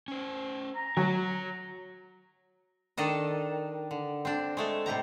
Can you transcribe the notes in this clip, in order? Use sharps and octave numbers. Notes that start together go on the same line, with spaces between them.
C#4 C5
A#5
F#3 F#4 C#5
D#3 D4 A4 D#5
D3
C4 D4
G#3 A3 A4
A2 C3 G4 A#5